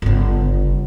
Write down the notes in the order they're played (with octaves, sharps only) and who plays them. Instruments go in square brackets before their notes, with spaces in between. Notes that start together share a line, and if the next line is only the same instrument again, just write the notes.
[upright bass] G1 C#3